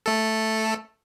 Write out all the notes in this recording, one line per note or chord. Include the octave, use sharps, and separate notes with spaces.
A3 A4